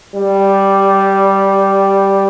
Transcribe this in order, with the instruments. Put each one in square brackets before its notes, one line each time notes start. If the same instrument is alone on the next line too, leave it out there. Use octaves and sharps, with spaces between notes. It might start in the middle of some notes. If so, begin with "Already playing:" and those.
[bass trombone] G3